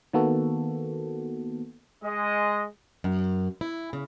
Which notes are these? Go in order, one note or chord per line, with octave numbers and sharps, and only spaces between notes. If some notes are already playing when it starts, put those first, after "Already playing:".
D#3 A#3 B3 F#4 A4
G#3 D#5
F#2
E4
C#3